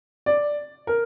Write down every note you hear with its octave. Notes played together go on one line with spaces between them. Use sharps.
D5
A#4